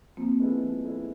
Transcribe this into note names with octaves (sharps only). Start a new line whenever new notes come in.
F3 A#3 C4
G#3 B3 E4 A4
F3
G#3 B3 E4 A4